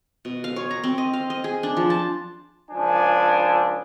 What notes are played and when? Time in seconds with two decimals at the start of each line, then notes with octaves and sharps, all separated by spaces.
0.25 B2
0.44 F5
0.56 C#5
0.71 A#5
0.84 C4
0.98 D#5
1.13 F5
1.30 D#5
1.44 G#4
1.63 D4
1.77 F3
1.90 A5
2.71 C#2 F3 D4 G#5